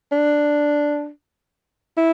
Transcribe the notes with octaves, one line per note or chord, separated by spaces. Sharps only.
D4
E4